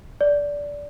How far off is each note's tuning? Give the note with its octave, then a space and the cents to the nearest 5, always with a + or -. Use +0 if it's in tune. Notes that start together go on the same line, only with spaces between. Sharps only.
D5 -15